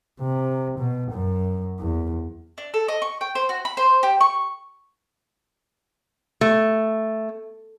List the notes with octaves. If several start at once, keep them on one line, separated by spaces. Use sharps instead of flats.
C3
B2
F#2
E2
D4
A4
D#5
C#6
G5
C5
F#4
B5
C5
G4
C#6
A3